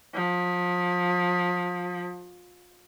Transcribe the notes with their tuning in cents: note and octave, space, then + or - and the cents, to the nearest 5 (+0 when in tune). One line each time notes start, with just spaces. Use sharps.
F3 +30